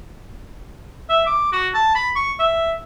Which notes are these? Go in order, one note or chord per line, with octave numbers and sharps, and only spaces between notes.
E5
D6
F#4
A5
B5
C#6
E5